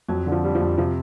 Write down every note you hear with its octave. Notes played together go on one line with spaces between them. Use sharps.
F2 F#3
D3
F3
G3
F3
F2
C3 F3